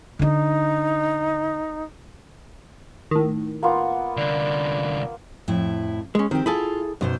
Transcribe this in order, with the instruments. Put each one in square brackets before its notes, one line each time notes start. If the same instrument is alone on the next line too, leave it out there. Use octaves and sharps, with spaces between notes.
[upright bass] D3 D4 [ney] D#4
[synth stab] A2 D#3
[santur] A#3 B3 F4 [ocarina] F#5
[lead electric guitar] C2 D3 [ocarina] D5
[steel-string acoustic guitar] F2 A2 E4
[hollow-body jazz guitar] G#3 C#4
[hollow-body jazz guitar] D#3 [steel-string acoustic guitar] C4 G4
[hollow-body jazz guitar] E4 G#4 A4 [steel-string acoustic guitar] F4
[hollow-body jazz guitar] B1 [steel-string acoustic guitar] F#2 B2 C5